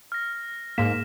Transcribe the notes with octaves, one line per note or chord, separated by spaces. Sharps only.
F6 A#6
G#2 A#3 B6 E7